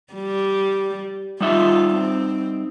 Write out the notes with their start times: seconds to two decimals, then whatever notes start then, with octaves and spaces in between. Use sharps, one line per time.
0.13 G3
1.41 G3 D#4 F4 E5
1.95 C4